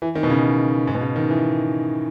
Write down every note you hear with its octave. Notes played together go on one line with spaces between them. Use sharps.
E3
D#3
B2
C#3
G#2
B2
C#3
D#3
E3